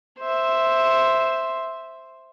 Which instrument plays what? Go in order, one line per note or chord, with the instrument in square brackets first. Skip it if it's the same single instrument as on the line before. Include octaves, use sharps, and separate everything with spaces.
[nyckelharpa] C5 E5